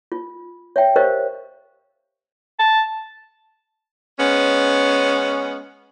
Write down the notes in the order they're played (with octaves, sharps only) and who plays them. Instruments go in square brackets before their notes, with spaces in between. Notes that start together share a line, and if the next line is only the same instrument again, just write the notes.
[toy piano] F4
C#5 E5 G5
G4 A#4 C5 C#5 D#5 F5
[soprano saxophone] A5
[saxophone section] G#3 B3 C#4